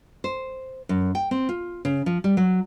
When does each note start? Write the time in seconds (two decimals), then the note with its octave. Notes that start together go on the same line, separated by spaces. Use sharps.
0.24 C5
0.89 F#2
1.15 G5
1.31 C4
1.49 F4
1.85 C#3
2.06 F3
2.24 G3
2.37 F#3